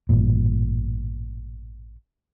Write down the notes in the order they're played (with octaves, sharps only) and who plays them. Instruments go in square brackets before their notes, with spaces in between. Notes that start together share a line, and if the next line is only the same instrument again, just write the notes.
[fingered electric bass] A1 G2 A#2